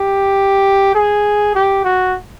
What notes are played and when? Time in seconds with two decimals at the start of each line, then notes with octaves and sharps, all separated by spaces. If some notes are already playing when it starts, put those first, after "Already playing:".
Already playing: G4
0.95 G#4
1.55 G4
1.84 F#4